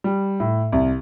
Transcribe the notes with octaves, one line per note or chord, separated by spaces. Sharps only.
G3
A2
C2